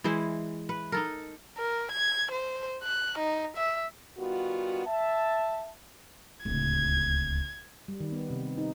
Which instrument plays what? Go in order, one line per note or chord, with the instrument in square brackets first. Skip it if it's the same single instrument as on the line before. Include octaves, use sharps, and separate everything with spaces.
[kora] E3 G#3 E4 C5
B4
D#4 A4 A#4
[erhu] A#4
G#6
C5
F#6
D#4
E5
[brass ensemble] D#3 G3 B3 F4 F#4
E5 A5
[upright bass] D1 C#2 [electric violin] G#6
[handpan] G3
D#3
B3
C3
D#4